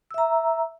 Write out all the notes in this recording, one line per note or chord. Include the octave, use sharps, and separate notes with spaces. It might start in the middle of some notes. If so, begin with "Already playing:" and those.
E5 A#5 E6